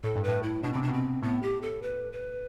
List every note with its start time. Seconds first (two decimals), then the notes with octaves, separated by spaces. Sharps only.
0.04 A2 A4
0.16 G2
0.24 A2 B4
0.43 E4
0.63 B2 D4
0.73 C3 C4
0.82 D4
0.88 B2
0.93 C4
1.22 A2 B3
1.42 G4
1.62 A4
1.82 B4
2.12 B4